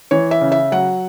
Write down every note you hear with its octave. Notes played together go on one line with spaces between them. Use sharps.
E3 C#5
E5
C#3
E5
F#3 F#5